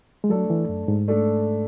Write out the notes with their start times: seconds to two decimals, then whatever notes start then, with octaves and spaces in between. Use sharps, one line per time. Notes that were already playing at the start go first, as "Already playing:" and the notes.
0.24 G#3
0.30 F#3 A3 D4 A4
0.50 E3
0.69 F#2
0.88 G#2
1.08 A3 D4 A4